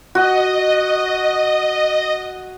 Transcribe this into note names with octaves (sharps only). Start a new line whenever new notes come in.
F#4 D#5